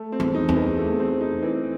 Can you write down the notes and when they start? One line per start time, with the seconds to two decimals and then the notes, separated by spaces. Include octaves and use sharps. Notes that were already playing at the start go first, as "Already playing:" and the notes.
Already playing: A3
0.12 C4
0.20 E2
0.35 D#4
0.49 E2
0.56 E3
0.78 A3
0.99 C4
1.21 D#4
1.43 E3